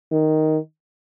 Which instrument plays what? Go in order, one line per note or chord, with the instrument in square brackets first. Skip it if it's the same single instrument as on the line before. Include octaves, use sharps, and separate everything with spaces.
[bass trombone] D#3